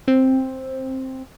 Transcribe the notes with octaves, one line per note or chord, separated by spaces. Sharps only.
C4